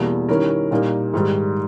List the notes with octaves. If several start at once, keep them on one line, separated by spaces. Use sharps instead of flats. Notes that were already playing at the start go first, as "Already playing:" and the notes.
Already playing: E2 B2 G3 A#3 E4
D#3 G3 C#4 E4 A#4
A#2 G3 A#3 D#4
G#2 D#3 G3